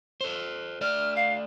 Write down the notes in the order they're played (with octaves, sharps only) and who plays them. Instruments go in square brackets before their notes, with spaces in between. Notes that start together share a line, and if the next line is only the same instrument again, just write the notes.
[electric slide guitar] A4 C5
[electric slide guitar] A3 D5 [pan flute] F6
[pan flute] F5